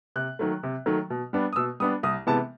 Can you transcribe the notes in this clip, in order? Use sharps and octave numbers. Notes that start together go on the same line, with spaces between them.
C3 F#6
D#3 F#3 A3
C3
D#3 F#3 A3
B2
G3 B3 D4
D#6
B2 E6
G3 B3 D4 D#6
C2 D#6
C3 E3 G#3 B3 A5